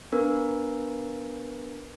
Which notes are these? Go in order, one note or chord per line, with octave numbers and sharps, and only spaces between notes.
B3 D4 A#4 B4